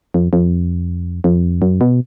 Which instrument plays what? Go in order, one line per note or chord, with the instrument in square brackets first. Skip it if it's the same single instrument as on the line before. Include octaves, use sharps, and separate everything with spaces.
[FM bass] F2
F2
F2
F#2
B2